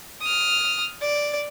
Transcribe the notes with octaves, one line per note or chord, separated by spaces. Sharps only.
D#6 F6
D5